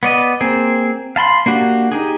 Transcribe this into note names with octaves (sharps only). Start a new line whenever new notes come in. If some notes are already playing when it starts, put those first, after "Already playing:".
B3 D5 D#5
A#3 C4 G#4
F5 A5 B5 C6
A#3 D4 F#4 G4
D#4 G4 G#4